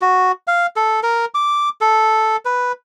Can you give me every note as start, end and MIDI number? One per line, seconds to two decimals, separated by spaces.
0.02 0.32 66
0.47 0.67 77
0.76 1.00 69
1.03 1.25 70
1.34 1.69 86
1.81 2.37 69
2.45 2.72 71